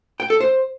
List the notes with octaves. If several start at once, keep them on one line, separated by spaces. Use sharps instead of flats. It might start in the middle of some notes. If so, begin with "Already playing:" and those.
G5
A4
C5